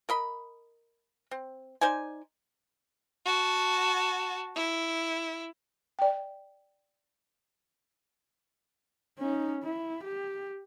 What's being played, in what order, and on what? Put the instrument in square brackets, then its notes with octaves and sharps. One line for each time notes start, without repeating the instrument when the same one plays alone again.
[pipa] A#4 D#5 B5
C4
D#4 C5 D5 G#5
[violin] F#4 A5
E4
[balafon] D5 G5
[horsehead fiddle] C#4 D#4
E4
G4